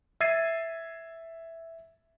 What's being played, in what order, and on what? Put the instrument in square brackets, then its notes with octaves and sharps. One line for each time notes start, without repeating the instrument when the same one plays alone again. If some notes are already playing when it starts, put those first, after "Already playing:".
[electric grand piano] E5 E6 G#6 A6 C7 D#7